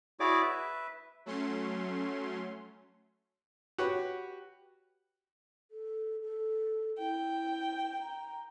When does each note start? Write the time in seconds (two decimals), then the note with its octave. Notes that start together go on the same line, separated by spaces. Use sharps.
0.20 E4 F#4 G#4 C#5 D5 D6
0.42 B4 E5
1.26 F#3 A3 C#4 C6
3.78 F#4 G4 B4 C#5
5.71 A4
6.21 A4
6.99 E4 G5
8.00 A#5